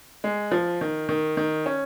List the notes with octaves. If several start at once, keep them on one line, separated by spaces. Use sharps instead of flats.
G#3
F3
D#3
D#3
D#3
C#4